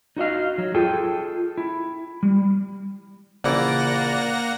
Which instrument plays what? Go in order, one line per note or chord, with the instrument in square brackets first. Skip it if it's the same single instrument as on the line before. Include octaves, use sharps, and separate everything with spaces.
[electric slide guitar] D#4 F#4 D#5 F5
F#3
F4 G#4 A4 G5
E4
G3
[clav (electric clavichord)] A#1 E3 [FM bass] C#3 [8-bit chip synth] A#3 F#5 A#6 [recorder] D5